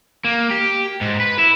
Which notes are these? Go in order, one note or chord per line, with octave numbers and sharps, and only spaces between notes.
A#3
G4
G#2
B4
E4